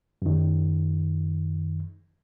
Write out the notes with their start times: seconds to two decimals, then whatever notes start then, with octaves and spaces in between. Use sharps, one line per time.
0.22 F#2 D#3